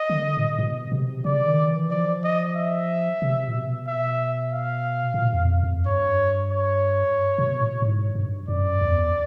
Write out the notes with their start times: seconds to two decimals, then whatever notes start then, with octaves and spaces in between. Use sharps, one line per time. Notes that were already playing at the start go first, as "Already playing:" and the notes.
Already playing: D#5
0.10 D#3
0.15 D3
0.37 A2
0.59 B2
0.92 C3
1.25 C#3 D5
1.47 D#3
1.68 E3
1.91 F3 D5
2.24 D#5
2.56 E5
3.22 C3
3.48 A#2
3.56 B2
3.87 E5
4.53 F5
5.14 A2
5.19 A#2
5.33 E2
5.41 F2
5.63 F2
5.85 G2 C#5
6.51 C#5
7.38 B2
7.60 A2
7.82 G#2
8.15 G2
8.48 F#2 D5
8.81 E2